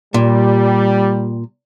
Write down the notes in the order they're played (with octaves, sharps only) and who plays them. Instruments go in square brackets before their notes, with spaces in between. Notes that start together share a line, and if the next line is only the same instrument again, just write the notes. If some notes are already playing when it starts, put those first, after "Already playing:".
[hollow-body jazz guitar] A#2 [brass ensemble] G3